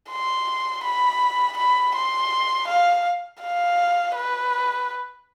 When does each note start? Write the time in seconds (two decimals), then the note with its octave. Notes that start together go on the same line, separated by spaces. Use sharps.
0.11 C6
0.84 B5
1.58 B5
1.95 C6
2.68 F5
3.41 F5
4.16 B4